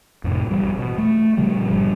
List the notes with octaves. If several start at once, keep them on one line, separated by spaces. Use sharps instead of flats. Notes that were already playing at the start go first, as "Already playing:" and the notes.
F2 A2 C3
A1 E3 G3
B2
A3
A#2 C#3 F3 G3
G1 G3